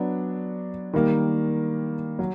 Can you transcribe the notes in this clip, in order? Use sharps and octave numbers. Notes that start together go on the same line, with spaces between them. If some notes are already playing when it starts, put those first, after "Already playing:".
Already playing: F#3 B3 D4
D#3 G3 A#3
F#3